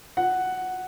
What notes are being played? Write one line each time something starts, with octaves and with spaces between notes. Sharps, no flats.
F#5